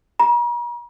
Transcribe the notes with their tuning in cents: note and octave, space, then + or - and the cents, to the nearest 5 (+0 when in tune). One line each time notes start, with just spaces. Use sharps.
A#5 +45